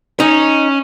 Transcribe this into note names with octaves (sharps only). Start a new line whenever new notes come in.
C#4 D#4